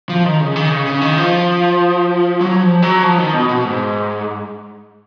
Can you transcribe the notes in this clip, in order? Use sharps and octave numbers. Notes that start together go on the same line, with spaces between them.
F3
D#3
C#3
D#3
C#3
C#3
D#3
F3
F#3
F3
F#3
F3
D#3
B2
B2
G#2